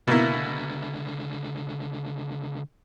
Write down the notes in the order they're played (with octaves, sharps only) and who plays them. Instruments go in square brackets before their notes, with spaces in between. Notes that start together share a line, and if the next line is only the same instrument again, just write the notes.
[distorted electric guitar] C#2 D3 [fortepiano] B2 A#3 E4